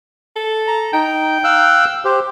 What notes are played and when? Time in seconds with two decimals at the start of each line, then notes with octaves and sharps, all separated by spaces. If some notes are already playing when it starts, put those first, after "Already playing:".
0.36 A4
0.68 A#5
0.93 D#4 G5
1.44 F5 E6 F#6
2.05 G4 C5